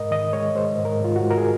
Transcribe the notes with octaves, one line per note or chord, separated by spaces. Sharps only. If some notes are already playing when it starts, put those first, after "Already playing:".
Already playing: G#2 G#3 A#4 D#5
D#3 D#5
G#3 C#5
G#3 C5
G#2
A#4
G#2 F4
F#4
G#2
A#4
G#4